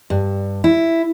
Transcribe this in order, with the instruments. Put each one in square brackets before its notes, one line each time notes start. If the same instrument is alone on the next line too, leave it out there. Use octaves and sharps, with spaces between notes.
[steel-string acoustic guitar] G2
E4